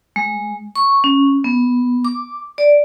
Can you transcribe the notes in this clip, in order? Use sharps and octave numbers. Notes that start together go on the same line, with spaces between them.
G#3
C#6
C#4
B3
D6
D5